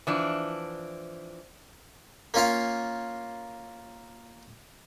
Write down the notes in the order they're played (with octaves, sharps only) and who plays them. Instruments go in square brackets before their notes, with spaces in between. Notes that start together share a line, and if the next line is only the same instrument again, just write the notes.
[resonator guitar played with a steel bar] E3 F3 D4
[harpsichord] A#3 C#4 F4 F5